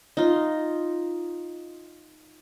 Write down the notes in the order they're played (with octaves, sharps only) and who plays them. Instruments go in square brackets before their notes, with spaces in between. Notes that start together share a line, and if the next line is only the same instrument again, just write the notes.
[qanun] D#4 F4